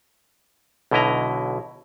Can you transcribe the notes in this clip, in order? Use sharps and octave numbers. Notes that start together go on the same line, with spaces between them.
B1 B2 D3 E4 D#5 A#5